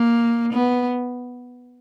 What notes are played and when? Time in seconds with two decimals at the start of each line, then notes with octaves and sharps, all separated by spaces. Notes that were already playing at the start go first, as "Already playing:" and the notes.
Already playing: A#3
0.53 B3